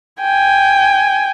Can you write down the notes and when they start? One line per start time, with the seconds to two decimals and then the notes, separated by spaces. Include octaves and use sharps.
0.21 G5 G#5